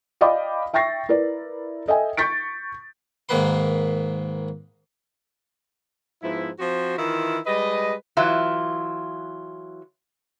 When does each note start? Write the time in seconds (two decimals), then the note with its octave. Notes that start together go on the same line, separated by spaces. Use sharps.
0.21 D5 D#5 F5 G5 B5 D6
0.74 E5 G5 C#6 A6 A#6 C7
1.09 E4 A#4 B4 D5
1.88 A4 D#5 E5 G5 G#5
2.17 C#6 G6 A6 B6 D7
3.29 G#2 D#3 A#3 B4 C6
6.22 G#2 F3 B3 E4
6.59 F3 C4 F#4 C5
6.97 D#3 E3 E4 F4
7.46 G3 G#3 B4 D#5
8.17 E3 F#3 E4 F4